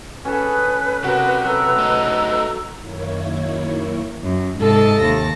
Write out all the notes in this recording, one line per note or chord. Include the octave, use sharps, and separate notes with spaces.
C#4 G#4 A4 B4
C3 F#4 A#4
F#3 A4 A#5 E6
A3 D#4
F#2 D#3 A#3 E4 C#5
F#2
G#2 C3 A4 D#5 A5
D#2 A5 A#6